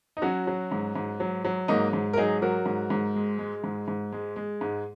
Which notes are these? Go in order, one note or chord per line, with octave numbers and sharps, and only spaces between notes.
D#4
F#3 C#4 F#4
F#3
G#2
G#2
F#3
F#3
G#2 A#3 D#4
G#2
A#4
F#3 D#4 G#4
F#3 F#4 A#4
G#2
G#2
G#3
G#3
G#2
G#2
G#3
G#3
G#2